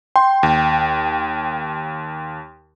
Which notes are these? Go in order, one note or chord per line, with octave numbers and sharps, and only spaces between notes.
G5 C6
D#2